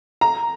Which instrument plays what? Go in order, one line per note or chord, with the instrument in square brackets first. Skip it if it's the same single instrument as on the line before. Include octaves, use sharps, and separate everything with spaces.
[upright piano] A#5